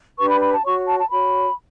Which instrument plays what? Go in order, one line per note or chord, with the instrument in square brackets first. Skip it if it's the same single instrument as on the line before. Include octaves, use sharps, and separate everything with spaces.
[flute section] D4 G4 B4 C#6
B5
B5
A5
F#4 C#5 C#6
A5
A5
F#4 C#5 B5